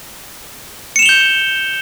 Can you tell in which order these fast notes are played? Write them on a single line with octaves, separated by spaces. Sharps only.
C#7 E7 F7 G7 G6